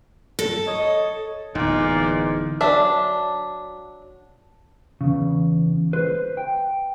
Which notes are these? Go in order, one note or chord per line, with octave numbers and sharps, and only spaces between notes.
A4
C#5 D#5
D1 E2 A#2 D#4 D6
F#3 D4 E5
E2 C#3
B4 C5
G5